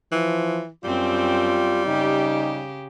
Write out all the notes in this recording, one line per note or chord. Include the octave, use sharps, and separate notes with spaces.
E3 F3
F#2 G3 C4 F4
C#3 D#4 G4